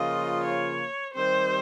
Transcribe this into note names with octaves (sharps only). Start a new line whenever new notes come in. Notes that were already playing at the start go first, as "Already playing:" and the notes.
Already playing: C#3 F3 A#3 F4 D#5
C#5
D#3 G3 C4 G4 C5